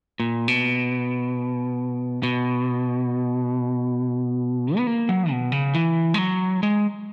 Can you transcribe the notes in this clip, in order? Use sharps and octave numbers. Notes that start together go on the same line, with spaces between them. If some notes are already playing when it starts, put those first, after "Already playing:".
A#2
B2
B2
B3
A#3
F#3
B2
C#3
E3
G#3
F#3
G#3